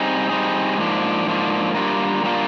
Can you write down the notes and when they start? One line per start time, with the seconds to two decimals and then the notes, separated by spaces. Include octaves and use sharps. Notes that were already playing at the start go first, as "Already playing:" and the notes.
Already playing: G3 C4 D#4 G#4
0.29 G3 C4 D#4 G#4
0.78 G#2 F3 A#3 D4
1.26 G#2 F3 A#3 D4
1.75 G3 A#3 D4 F4 A#4
2.23 G3 A#3 D4 F4 A#4